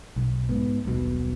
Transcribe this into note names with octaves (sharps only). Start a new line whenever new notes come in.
B1
G#2 B3
D#1 B1 B2